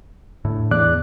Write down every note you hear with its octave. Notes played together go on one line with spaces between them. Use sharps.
A2 D3
E2 D5 F#6